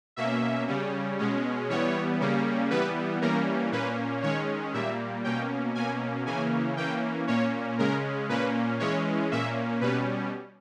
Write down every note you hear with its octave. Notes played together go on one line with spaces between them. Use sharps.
B2 A#3 C#4 E5
C#3 G3 C#4
B2 G#3 C#4
E3 G3 B3 C#5
C#3 G3 A#3 C#4
E3 G3 B3 B4
E3 G3 A#3 C#4 A#4
A#2 A#3 C#4 B4
D#3 G#3 C#4 C#5
A#2 G3 A#3 E5
B2 A#3 C#4 G5
B2 A#3 C#4 G#5
C#3 E3 A#3 C#4 G#5
E3 A#3 C#4 G5
A#2 A#3 C#4 C#5
C#3 G#3 C#4 A#4
A#2 A#3 C#4 B4
E3 G#3 C#4 C#5
A#2 A#3 C#4 E5
B2 G3 C#4 B4